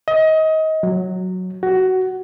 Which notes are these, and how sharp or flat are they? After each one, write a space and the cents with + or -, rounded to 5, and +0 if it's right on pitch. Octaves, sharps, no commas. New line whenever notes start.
D#5 +25
F#3 -5
F#4 +15